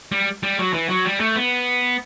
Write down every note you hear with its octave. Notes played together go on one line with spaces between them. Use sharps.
G3
G3
F#3
E3
F#3
G3
A3
B3